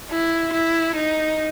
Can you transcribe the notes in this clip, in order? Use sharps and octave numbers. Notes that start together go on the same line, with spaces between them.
E4
E4
D#4